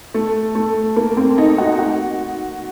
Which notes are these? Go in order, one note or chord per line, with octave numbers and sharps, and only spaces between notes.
A3
A3
A#3
C4
D#4
F#4
F#4